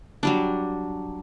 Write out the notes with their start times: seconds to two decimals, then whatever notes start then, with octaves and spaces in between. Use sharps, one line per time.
0.23 F#3 G3 D4